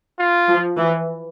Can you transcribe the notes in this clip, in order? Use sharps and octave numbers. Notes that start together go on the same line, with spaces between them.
F4
F3
E3